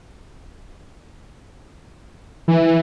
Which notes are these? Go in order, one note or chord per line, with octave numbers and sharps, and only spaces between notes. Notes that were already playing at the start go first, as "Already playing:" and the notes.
E3